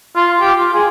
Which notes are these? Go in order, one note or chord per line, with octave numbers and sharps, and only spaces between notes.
F4
G4
F4
G#4